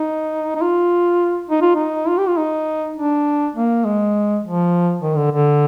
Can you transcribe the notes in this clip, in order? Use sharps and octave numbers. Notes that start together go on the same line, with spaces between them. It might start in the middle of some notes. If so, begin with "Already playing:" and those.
Already playing: D#4
D#4
F4
D#4
F4
D#4
F4
G4
F4
D#4
D4
A#3
G#3
F3
D#3
D3
D3